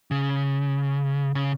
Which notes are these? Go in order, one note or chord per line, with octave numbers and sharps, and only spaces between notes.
C#3
C#3